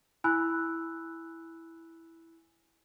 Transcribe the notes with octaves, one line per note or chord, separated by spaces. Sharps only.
E4 G#5 B5 E6 F#6